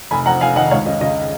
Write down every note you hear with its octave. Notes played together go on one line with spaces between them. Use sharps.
F1 G#5 B5
F2 F#5 A#5
F1 F5 G#5
D#3 D#5 F#5
C#2 C#5 F5
C#3 D#5
C#3 D#5